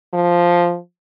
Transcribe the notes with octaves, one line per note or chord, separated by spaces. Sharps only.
F3